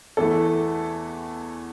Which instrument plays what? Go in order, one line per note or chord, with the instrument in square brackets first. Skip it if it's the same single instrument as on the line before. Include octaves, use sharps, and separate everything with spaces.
[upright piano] E2 E3 A3 A4